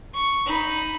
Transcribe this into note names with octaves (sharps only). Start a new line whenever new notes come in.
C#6
D#4 B5